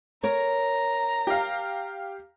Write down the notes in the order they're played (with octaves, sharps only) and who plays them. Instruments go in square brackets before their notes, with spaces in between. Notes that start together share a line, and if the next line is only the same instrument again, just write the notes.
[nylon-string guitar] A#4 C#5 [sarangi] A#5
[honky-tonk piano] G4 F5